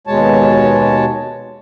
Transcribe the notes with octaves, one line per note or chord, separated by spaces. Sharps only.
D#2 B2 G#3 C#5 A5